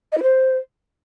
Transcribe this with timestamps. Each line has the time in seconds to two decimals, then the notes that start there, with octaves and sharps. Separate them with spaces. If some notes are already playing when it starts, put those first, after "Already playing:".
0.12 D#5
0.17 E4
0.22 C5